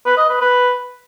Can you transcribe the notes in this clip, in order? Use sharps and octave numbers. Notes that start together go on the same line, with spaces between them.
B4
D#5
B4
B4